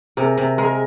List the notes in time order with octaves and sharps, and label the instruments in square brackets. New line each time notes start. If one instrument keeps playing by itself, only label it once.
[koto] C3 [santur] G#4 A#4
[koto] C3
[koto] G#3 [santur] G#4 A#4